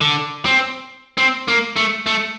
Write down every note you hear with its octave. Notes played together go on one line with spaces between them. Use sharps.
D3
C4
C4
A#3
A3
A3